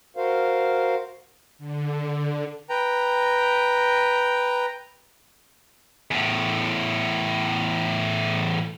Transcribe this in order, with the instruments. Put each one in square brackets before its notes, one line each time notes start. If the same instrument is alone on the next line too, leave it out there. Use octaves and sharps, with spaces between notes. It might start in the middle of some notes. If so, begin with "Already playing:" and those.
[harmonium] F#4 A#4 C5 F5
[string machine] D3
[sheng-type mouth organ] B4 G5 A#5
[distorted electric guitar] E2 A2